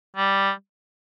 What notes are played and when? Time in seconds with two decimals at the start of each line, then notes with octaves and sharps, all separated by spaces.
0.17 G3